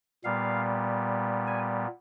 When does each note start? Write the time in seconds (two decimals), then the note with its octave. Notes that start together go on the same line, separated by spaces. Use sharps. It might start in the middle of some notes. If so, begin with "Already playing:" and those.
0.24 A#2 G3 B3 F5
1.47 G#5